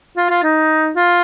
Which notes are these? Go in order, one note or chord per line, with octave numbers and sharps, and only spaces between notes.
F4
F4
D#4
F4